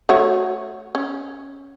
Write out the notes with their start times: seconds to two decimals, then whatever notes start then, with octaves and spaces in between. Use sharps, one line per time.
0.09 A3 F#4 C#5
0.95 C#4